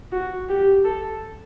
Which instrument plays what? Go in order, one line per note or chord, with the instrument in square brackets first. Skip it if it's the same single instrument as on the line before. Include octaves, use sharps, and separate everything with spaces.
[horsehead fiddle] F#4
G4
A4